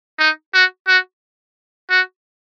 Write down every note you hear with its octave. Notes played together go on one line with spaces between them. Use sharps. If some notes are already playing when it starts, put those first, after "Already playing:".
D#4
F#4
F#4
F#4